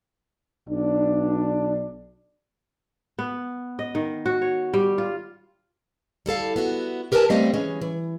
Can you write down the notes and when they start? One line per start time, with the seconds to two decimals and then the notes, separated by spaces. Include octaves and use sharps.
0.70 B1 D4
3.19 B3
3.79 D#5
3.95 D#3
4.26 F#4
4.42 C#5
4.74 G3
4.98 F4
6.26 G3 E4 A4 F5
6.56 B3 E4 F#4
7.12 G4 A#4 B4 D#5 G#5 A5
7.30 G3 A3 B3 C4 D#5 F5
7.54 E3 G#3 C#4
7.81 E3